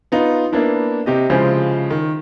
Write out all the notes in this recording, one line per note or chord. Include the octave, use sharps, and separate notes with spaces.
B3 D#4 F4
A#3 B3 D4 E4
C3 G4 D#5
C#3 F3 G#3 E4 C5
D#3